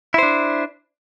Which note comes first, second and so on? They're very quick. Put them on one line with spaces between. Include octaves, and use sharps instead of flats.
E4 C5 D4